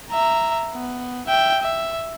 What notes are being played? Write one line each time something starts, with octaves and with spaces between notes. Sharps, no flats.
E5 A#5
B3
E5 G5
E5